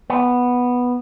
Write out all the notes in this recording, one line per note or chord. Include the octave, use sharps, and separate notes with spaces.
B3